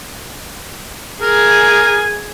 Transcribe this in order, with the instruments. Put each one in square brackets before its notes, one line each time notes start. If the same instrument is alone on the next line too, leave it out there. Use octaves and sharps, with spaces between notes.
[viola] G#4 G#5 [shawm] A#4